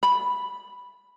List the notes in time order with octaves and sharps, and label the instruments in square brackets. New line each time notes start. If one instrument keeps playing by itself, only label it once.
[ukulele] B5